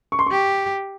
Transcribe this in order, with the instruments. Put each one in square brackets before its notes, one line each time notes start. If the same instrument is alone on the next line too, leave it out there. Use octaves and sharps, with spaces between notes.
[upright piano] C#6
C6
[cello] G4 [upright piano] C#6